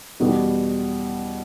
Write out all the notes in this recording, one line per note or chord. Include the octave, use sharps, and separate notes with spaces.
E2 B2 G3